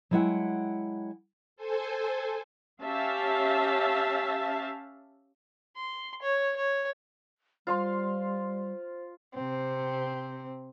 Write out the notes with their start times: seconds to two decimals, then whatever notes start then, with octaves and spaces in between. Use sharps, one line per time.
0.11 F#3 G#3 E4 D5 F#5 G5
1.56 A4 C5 G#5
2.82 C#4 G4 E5 F5 A5
5.76 C6
6.22 C#5
6.56 C#5
7.67 G3 F4 C5 F5 C6
9.33 C3 C4